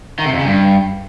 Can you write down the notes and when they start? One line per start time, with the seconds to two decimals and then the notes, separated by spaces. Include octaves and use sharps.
0.19 D#3
0.26 C3
0.32 F2
0.39 C#3
0.46 G2